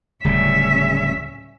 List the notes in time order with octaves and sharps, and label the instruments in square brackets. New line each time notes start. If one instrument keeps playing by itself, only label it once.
[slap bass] D1 C#3 G3 [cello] C#4 E5